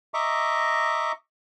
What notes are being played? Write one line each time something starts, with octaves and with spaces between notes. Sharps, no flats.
D#5 E5 A#5 C#6 D6